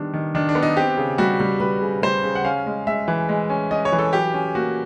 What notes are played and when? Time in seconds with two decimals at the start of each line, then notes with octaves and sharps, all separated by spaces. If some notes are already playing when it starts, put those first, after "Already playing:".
Already playing: D#3 G3 B3 D4
0.14 D#3
0.35 D#3 D4
0.49 D4
0.55 B3
0.63 D#4
0.77 C4 G4
0.97 C#3
1.18 G3 F#4
1.40 G3
1.60 G3 B4
1.81 C#3
2.03 G3 C5
2.24 C#3
2.35 F#5
2.44 C#4 F5
2.66 G#3
2.87 G#3 E5
3.08 E3
3.29 G#3
3.50 C#4
3.71 C#4 D#5
3.85 C#5
3.92 E3
3.99 A4
4.13 F#3 G4
4.34 C#4
4.55 A#3 F#4